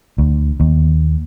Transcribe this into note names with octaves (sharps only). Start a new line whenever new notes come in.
D2
D#2